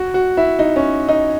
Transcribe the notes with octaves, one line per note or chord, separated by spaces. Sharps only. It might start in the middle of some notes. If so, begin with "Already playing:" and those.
Already playing: F#4
F#4
E4
D#4
C#4
D#4